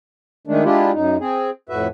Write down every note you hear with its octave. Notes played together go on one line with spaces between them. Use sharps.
D#3 G#3 A3 D4
G#3 D4 E4 F4 G4
F#2 D#4
C4 G#4
F2 A2 F#4 B4 E5